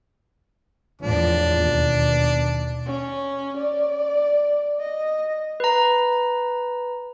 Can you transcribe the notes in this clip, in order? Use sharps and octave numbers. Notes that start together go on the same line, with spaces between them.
E2 A2 F3 D4
D#2 B2
C#4
D5
D#5
B4 A#5